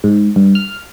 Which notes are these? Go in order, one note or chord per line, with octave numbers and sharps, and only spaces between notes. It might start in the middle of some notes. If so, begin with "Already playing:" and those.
G#2
G2
F6